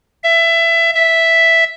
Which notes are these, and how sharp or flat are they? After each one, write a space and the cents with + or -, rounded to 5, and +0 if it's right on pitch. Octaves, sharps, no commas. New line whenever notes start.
E5 +20
E5 +0